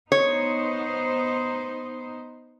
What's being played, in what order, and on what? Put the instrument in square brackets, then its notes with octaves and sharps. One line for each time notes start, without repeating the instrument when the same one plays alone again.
[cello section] B3 D#4 C5 [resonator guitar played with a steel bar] C#5